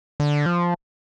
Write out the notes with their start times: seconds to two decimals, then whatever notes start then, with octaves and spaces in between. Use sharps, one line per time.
0.20 D3
0.46 F3